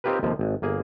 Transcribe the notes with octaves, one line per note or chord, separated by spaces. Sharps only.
C4 D#4 F4 G4 A#4 B4
D#2 C3 F3
G#1
G1 A#3 G#4